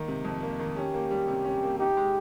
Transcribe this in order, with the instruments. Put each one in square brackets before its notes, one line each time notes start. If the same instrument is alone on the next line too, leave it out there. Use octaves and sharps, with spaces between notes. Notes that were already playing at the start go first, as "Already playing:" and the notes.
Already playing: [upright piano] D#3 A#3
C3
F2
A#3
D#3
[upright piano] C#4 [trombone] G4
[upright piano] A#3
G3
C3
C#4
A#3
[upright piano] D#4 [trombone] G4
[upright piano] G#3